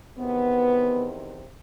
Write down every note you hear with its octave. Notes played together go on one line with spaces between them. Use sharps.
E2 C3 D#3 B3